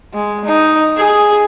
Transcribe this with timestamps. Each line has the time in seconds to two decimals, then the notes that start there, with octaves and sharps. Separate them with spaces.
0.13 G#3
0.45 D#4
0.97 G#4